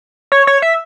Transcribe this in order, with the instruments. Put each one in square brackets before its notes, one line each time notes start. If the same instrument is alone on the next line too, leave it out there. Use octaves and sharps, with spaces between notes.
[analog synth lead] C#5
C#5
E5